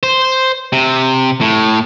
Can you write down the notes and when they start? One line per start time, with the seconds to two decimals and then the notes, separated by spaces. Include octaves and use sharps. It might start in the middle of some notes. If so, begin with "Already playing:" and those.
0.03 C5
0.73 C3
1.41 A2